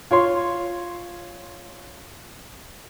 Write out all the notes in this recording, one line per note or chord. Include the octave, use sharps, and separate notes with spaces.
F4 C#5 C6